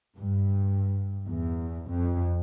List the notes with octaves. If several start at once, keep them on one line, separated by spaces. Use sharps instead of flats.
G2
E2
F2